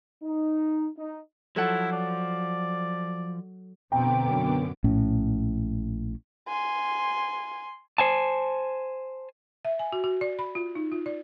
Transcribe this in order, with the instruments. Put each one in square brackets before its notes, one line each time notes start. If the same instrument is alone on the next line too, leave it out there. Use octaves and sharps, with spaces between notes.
[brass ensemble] D#4
D#4
[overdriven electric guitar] F3 [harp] F#3 A4 F#5 [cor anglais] E4
[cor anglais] D5
[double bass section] F2 B2 C4 [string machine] D3 B3 D6 [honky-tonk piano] G5 A#5
[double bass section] F#2
[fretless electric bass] A#1 A2 C#4
[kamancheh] G#5 C6
[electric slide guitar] C5 G#5 A5
[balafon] E5
G#5
F#4
F#4
D5
B5
F4
D#4
F4
D5